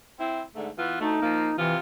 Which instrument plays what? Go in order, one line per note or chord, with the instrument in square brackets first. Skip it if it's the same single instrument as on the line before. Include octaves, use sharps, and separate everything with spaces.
[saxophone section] C4 E4
G#2 D3 A3
E3 B3 F4
[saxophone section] D2 A3 [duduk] D#4
[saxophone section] F3 A#3
[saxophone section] C3 F4 [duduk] E3